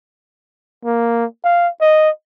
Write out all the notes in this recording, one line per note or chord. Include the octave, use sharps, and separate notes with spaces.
A#3
F5
D#5